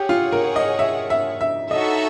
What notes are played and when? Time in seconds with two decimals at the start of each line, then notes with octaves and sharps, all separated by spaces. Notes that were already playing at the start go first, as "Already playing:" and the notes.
Already playing: G4 G#4 C#5 F#5
0.09 F4
0.32 A#4
0.56 D#5
0.79 E5
1.10 E5
1.41 E5
1.71 D#4 F#4 A4 C#5 D#5 E5